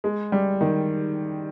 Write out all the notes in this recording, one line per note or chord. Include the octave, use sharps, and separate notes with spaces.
G#3
G3
D#3